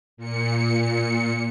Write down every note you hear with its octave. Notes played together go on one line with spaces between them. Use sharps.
A#2 C#7